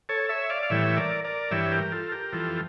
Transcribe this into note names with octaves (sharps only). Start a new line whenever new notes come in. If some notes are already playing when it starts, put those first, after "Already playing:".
A4 C#5
C#5 E5
D5 F5
F5
A2 E3 G3 C#5 E5
A#4 D5
A#4 D5
G2 E3 G3 C#5 E5
G4 A#4
F4 A4
G4 A#4
F2 E3 G3 F4 A4